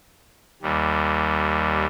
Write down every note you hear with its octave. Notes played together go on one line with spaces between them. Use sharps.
D#2 G3